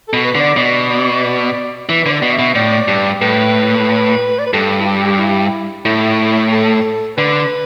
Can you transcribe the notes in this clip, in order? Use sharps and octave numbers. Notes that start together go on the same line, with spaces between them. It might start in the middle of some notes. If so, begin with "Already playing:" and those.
A4
B2
B4
D3
D5
B2 D5
D5
E3 B4
D3 B4
D5
B2
E5
B2
A2 D5
G2
A2 B4
D5
B4
G2 A4
E4
G4
E4
A2 E4
A4
D3 B4